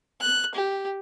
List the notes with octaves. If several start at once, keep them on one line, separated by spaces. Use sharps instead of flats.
F#6
G4